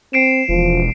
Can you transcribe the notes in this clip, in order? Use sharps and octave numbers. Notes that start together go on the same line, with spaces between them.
C4 C7 D7 E7
E1 F3